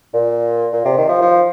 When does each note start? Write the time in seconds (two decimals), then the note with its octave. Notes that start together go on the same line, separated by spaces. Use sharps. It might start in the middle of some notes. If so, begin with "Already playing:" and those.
0.13 A#2
0.73 A#2
0.85 C3
0.97 D#3
1.09 F3
1.21 F3